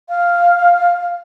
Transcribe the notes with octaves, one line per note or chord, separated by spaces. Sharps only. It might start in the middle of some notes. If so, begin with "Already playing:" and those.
F5